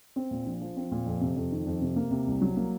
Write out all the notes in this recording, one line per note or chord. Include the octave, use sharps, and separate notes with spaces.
C4
A#2
A#1
F3
C4
A#2
F2
C3
F2
D#3
F2
C3
A#3
C3
C2
F#3
A#3